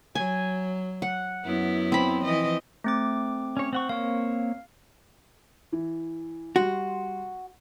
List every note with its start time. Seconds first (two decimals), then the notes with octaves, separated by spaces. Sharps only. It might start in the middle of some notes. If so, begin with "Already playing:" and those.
0.15 F#3 G#5
1.02 F#5
1.44 F#2 B3 E4
1.92 C4 B5
2.24 E3 F3 D#5
2.84 A3 C4 D6
3.57 C#4 C#5
3.73 C4 F#5 C#6
3.89 A#3 C4 C#5 F5
5.72 E3
6.56 G3 F#4 C6